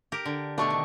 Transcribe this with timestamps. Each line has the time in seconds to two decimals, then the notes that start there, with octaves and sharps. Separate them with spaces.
0.12 G4 A#4
0.25 D3
0.58 B2 A3 D4 G5 C#6
0.70 D#3